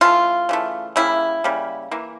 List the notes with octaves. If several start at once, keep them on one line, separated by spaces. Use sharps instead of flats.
C#3 E3 A3 F4
C#3 E3 A3
C#3 G3 A#3 E4
C#3 G3 A#3
E3 A#3